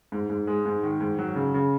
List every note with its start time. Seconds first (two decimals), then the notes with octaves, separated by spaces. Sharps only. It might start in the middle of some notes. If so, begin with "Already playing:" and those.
0.12 G#2
0.30 G#2
0.47 G#3
0.66 G#2
0.83 D#3
1.00 G#2
1.19 F#3
1.35 C#3
1.54 C#3